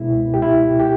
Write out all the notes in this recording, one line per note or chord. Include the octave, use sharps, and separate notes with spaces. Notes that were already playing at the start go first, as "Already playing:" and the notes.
Already playing: C#2 B2 G#3 B3 E4
G4
E4
G4